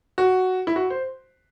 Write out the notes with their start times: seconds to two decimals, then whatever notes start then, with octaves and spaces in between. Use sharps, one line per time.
0.18 F#4
0.67 E4
0.76 F#4
0.90 C5